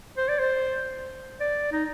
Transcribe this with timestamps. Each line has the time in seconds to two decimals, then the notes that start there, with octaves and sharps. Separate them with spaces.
0.17 C5
0.28 D5
0.39 C5
1.40 D5
1.72 D#4